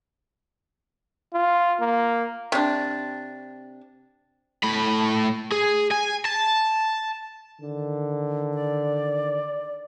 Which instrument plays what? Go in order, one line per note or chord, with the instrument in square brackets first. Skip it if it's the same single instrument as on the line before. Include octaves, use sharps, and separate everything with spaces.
[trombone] F4
A#3
[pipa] C3 D4
[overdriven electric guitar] A2 B5
G#4
G#5
A5
[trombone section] D3 D#3
[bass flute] D5